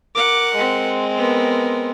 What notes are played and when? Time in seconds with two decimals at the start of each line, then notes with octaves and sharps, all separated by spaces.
0.15 A#4 F#5 D6
0.55 G#3 C4
1.17 B3 A#4